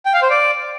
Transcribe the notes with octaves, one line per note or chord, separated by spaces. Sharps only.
G5
F5
C5
D5